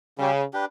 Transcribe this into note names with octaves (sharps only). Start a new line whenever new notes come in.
C#3 G3 C#4 G4
D4 G4 B4